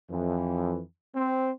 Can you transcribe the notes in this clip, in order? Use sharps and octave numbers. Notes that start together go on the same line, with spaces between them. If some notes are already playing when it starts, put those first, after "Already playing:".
F2 E3
C4